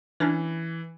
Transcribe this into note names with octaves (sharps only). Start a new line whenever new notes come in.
E3 C#4 D4